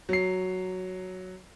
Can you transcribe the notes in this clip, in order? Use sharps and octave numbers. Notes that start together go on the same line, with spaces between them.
F#3 C7